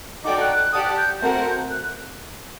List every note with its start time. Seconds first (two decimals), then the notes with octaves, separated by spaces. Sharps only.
0.24 D#4 F#4 A4 D5 G5 D6
0.41 F#6
0.56 F#6
0.73 G4 D5 F#5 A5 D#6
0.85 F#6
0.97 G6
1.22 A3 C4 F#4 A#4 F#5 G6
1.71 F#6